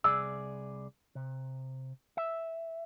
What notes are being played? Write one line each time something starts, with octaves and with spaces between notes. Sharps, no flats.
C2 G#4 D5 E6
C3
E5